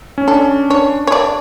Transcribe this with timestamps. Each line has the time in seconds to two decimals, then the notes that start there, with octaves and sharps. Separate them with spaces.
0.18 C#4
0.28 D4 A4
0.70 D4 C#5
1.07 C#5
1.12 D5